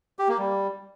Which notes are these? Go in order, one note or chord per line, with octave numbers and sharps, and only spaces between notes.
G4
A#3
G3